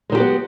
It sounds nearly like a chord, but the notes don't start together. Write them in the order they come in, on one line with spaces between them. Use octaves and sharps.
G#3 D#3 G4 F#3 B3